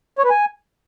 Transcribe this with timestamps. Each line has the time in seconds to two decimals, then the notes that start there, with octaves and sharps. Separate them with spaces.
0.18 C#5
0.24 B4
0.30 G#5